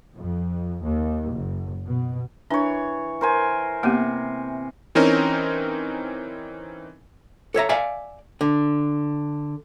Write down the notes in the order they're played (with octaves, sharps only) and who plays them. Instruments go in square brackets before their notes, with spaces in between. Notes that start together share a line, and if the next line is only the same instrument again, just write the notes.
[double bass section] F2
D#2
F#1
B2
[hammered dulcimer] E3 C#5 [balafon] D4
[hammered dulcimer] A#4 C5 G#5
[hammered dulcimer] C3 [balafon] A#3 B3 G4
[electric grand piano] E3 C4 C#4 D#4 A#4
[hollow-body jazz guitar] A4 C#5 E5 A#5
D5 E5 F5 G#5
D3